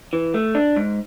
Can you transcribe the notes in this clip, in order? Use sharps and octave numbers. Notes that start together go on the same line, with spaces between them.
E3
A3
D4
G#2